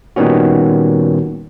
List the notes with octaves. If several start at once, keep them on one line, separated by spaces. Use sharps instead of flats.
A#2 D#3 G3 B3 C#4 F#4